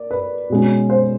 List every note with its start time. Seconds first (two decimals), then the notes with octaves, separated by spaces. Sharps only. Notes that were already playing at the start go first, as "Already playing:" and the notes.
Already playing: A#3 D5
0.11 B4
0.50 B2 G#3 C#4
0.90 C5